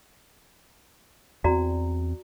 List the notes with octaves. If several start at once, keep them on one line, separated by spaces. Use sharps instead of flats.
E2 C4 F#4 D5 A#5